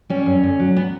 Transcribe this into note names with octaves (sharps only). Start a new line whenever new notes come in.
G3 C#4
F#2
D2
F#3
B3